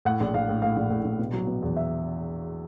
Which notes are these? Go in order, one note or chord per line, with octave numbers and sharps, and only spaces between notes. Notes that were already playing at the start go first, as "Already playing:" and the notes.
A2 F#5
A#1
A#1 F5
A2
A2 F5
A#1
A2
A#1
B2
F#3
B2
E2
E5